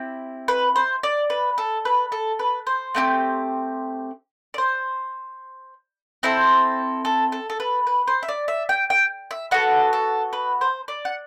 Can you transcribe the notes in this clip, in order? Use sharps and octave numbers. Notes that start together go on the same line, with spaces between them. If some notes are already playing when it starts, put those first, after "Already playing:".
Already playing: C4 E4 G4
B4
C5
D5
B4
A4
B4
A4
B4
C5
A3 C4 E4 G4
D5
C5
C4 E4 A4 C5
A4
A4
A4
B4
B4
C5
E5
D5
E5
G5
G5
E5
B3 F#4 A4 F#5
A4
B4
C5
D5
F#5